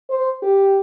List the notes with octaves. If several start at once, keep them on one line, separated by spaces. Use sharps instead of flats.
C5
G4